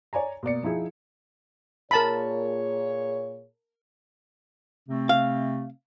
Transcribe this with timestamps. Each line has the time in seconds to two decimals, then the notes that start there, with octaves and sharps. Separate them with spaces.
0.13 C#5 D5 G#5 A#5
0.43 B2 A#3 D5 C#7
0.63 F3 D#4 E4 G#4
1.91 A#2 G#4 A#4 C#5 A5 B5
4.89 C3 A3 C4
5.09 F5